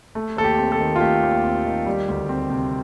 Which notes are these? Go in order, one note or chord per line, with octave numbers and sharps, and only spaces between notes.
A3
D#2 A4
G4
C4
A4
D#3
F4
A3 G4
D#2
C4
D#3
G3
D2
C4
C3